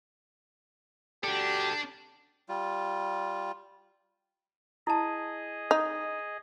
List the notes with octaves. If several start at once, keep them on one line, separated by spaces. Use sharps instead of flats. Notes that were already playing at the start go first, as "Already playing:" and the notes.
D4 F#4 G4 A4
G3 F4
E4 G#4 D#5 A5
D#4